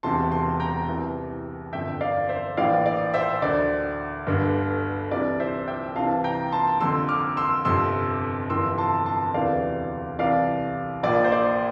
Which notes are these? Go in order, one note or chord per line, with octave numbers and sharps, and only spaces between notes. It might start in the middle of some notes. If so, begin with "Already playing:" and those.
E1 E2 C3 A5 C6
A5 C6
G5 A#5
C2 C3 E3
G1 F2 D3 E5 G5
D5 F5
C5 E5
A#1 A2 E3 D5 F5
D5
C5 E5
D2 D3 D5
G1 G2 D3
C2 C3 E3 D5
C5 E5
E5 G5
C2 C3 E3 F5 A5
G5 A#5
A5 C6
F1 F2 D3 C6 E6
D6 F6
C6 E6
G1 F2 C3 C6 E6
G1 F2 C3 E3 C6 E6
A5 C6
A5 C6
E1 D2 C3 E3 D5 F5
C2 C3 E3 D5 F5
A#1 A#2 D5
C5
D5